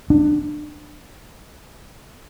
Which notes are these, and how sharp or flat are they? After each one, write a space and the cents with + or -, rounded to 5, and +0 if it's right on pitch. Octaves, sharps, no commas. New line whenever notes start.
D4 +25